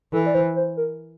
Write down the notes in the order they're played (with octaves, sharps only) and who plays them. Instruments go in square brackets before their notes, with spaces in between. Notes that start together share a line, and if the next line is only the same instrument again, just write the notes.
[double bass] E3 [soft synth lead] A4
[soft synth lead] D5
C5
C5
A#4